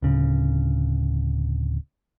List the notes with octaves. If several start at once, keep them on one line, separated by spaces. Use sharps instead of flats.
D1 C#3